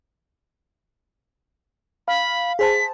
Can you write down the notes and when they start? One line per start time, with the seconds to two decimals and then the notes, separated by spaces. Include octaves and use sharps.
2.08 F5 B5
2.59 G#4 C5 A5 B6